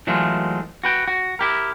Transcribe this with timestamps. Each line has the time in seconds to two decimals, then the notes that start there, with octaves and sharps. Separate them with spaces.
0.07 E3 F#3 G#3 A3 F4
0.84 F#4 B4 G5
1.08 F#4
1.39 E4 G4 A#4